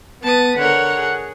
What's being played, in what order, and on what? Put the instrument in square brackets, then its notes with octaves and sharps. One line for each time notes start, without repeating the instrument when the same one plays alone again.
[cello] B3 B4 [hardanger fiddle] A5 D#6
[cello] D3 [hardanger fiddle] A#4 C#5 [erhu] F#5
[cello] G#4